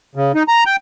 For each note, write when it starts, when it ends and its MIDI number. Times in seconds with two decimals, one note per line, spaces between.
0.15 0.32 49
0.35 0.43 63
0.48 0.64 82
0.66 0.76 79